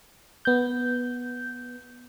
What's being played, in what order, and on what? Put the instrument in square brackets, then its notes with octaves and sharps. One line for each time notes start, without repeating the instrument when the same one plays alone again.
[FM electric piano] B3 G6